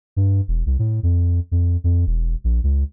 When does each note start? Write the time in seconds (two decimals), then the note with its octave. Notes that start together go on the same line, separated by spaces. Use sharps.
0.17 G2
0.48 E1
0.66 C2
0.79 A2
1.03 F2
1.51 F2
1.84 F2
2.07 E1
2.44 A#1
2.63 C#2